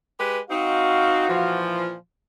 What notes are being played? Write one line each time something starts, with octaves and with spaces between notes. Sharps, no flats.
G#3 G4 B4
C4 D#4 F#4 F5
A#2 E3 F3